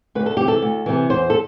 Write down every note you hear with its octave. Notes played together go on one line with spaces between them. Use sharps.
D2 B4
A4
C3 E3 G4
A4
D2
C3 E3
E2 C5
A4